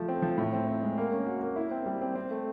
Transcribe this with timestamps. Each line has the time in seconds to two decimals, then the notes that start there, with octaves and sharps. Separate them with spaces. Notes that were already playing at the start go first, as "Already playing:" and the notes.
Already playing: F3 A3
0.08 C4
0.22 F3
0.38 A2
0.53 C4
0.68 C4
0.83 G#3
0.98 A#3
1.12 C#4
1.26 F#4
1.41 A#3
1.56 E4
1.71 C4
1.86 G3
2.01 C4
2.15 C4
2.30 A3